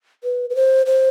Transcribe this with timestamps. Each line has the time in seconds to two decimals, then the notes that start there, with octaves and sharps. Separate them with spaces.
0.24 B4
0.50 B4
0.55 C5
0.86 C5